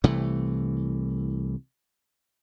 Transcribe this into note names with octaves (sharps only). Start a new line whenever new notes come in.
C2 C3 E3 A3